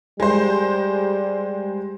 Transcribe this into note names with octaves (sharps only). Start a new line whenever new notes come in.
G3 G#3 C5